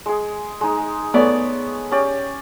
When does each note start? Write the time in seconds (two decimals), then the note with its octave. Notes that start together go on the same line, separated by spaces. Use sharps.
0.06 G#3 G#4
0.61 G#3 D#4
1.14 A3 B3 C#5 D5
1.91 C#4 G4 D5